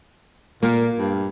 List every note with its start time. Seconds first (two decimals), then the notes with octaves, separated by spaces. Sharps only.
0.63 A#2 A#3
0.99 G2